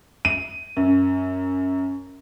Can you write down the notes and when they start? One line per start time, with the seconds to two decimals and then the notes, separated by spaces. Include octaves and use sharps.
0.25 D#7
0.77 F#2